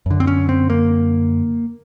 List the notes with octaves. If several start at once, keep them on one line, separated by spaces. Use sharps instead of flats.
F#2 D3
C4
C#4
C4
A#3